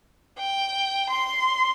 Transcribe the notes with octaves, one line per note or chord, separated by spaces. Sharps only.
G5
C6